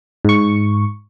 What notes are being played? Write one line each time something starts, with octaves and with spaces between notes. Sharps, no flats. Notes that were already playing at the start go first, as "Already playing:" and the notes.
G#2 C#6